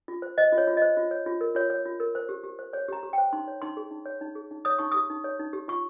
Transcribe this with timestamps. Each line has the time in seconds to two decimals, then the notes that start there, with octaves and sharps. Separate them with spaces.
0.08 F4
0.22 C5
0.38 C5 D#5
0.52 F4
0.58 C#5
0.67 F4
0.77 C5 D#5
0.97 F4
1.11 C#5
1.26 F4
1.41 A#4
1.55 F4 C#5
1.70 C#5
1.86 F4
2.00 A#4
2.15 C5
2.29 G4
2.43 G4
2.59 C5
2.73 C5 C#5
2.88 G4 A#5
3.03 G4
3.13 G5
3.18 C5
3.33 D#4 C6
3.48 C#5
3.62 D#4 C6
3.77 G#4
3.91 D#4
4.06 C#5
4.21 D#4
4.35 G#4
4.51 D#4
4.65 C#5 D#6
4.79 D#4 C#6
4.92 G4 D#6
5.10 D#4
5.24 C#5
5.39 D#4
5.53 G4
5.68 F4 C#6